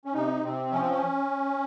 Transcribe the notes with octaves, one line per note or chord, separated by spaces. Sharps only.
C#4
C3 D#4
C3 C4
F3 C#4
C4
C#4